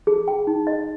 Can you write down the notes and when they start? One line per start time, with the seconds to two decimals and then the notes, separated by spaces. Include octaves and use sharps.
0.07 G#4
0.28 G5
0.47 D#4
0.67 D#5